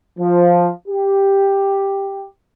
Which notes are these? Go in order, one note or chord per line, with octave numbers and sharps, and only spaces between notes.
F3
G4